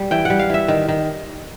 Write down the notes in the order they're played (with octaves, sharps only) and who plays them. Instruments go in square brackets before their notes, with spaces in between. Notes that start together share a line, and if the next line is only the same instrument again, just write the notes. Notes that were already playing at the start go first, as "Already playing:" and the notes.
Already playing: [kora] G3
E3 G5
G3 F#5
F5
E3 E5
D#3
D#3